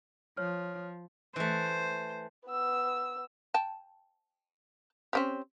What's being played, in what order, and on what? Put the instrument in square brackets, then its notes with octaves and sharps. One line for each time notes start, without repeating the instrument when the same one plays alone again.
[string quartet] F3 [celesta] C#5 F6
[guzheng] E3 A3 [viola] C5
[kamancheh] B3 E6
[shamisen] G5 A5
C4 C#4 G4